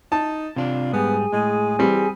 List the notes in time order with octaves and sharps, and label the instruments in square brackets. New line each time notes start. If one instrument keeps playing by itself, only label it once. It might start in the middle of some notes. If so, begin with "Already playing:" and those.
[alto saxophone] D#4 [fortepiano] A5
[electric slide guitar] C3 D4 [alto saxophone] F4
[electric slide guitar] G#2 G3 [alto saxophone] B3 [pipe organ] G#4 G#5
[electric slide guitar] A2 [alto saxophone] G#3
[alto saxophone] E3 [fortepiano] G3 C4